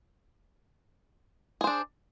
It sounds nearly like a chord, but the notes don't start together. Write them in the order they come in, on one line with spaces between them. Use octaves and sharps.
G#4 C5 D4